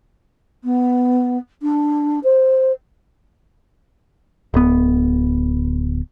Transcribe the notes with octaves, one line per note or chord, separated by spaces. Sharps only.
B3
D4
C5
D1 B3